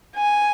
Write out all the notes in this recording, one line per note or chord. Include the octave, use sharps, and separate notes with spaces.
G#5